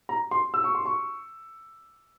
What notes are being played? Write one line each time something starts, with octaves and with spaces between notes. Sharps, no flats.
A#5
C6
E6
C#6
C6
C#6